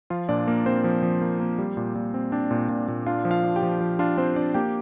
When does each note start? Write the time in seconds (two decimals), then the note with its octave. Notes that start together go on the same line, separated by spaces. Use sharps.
0.10 F3 F4 F5
0.29 A#2 D4 D5
0.47 A#3 A#4
0.66 A#3 C4 C5
0.84 F3
1.03 F3
1.22 A#3
1.40 A#3
1.58 G3
1.77 A#2
1.95 A#2
2.14 C4
2.32 C4 D4 D5
2.51 A#2
2.69 A#2
2.88 A#2
3.06 D4 F4 F5
3.25 F3
3.31 F4 F5
3.44 D4
3.56 G4 G5
3.63 F3
3.81 F3
3.99 D4 F4 F5
4.17 C4 D4 C5
4.36 D4 D5
4.54 A#3 G4 G5